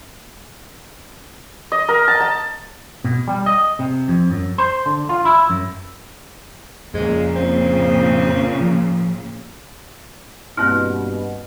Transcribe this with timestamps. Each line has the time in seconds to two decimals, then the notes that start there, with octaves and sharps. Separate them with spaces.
1.72 D#5
1.89 A#4
2.08 A5
2.20 A5
3.04 B2
3.28 G3
3.46 D#5
3.79 C3
4.08 F2
4.31 F#2
4.58 C5
4.86 D3
5.09 F4
5.25 E4
5.50 F#2
6.94 F2 A#2 C#3 F3 G#3
7.36 C4
8.61 F3
10.57 G2 B2 A#3 C4 E4 F6